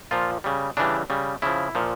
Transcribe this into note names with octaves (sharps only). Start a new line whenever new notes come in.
A#2 F3 F4
C#3 G3
C#3 E3 G3 D4
C#3 G3
C#3 F3 E4
A#2 F3